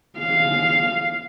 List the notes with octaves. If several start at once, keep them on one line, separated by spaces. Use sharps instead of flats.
F5